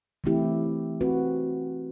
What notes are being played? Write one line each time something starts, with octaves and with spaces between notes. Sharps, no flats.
E3 A3 C4 E4 G4
C4 F#4 B4